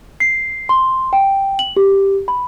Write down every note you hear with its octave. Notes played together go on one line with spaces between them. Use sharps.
C7
C6
G5
F#7
G4
B5